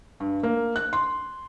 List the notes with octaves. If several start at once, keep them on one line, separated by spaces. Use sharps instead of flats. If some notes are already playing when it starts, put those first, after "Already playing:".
G2
A#3
F#6
C6